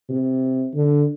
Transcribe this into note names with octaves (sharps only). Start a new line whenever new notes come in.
C3
D3